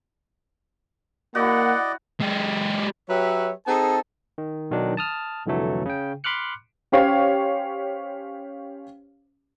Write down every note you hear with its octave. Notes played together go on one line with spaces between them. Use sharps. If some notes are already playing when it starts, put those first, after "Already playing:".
A#3 E4 F#4 D5 D#5 F#5
G#3 G4
F#3 G4 B4 C#5 E5
C4 D#4 G#4 A4 A5
D#3
B1 D#3 F#3 D4
A5 D#6 F6
C2 F2 D3 E3 F#3 A3
C#3 G5
B5 C6 D6 F6 F#6 C#7
C#4 G4 C5 C#5 F5